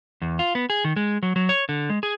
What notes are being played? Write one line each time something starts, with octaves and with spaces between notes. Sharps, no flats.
E2
F4
B3
G#4
D#3
G#3
F#3
F#3
C#5
D3
G#3
G#4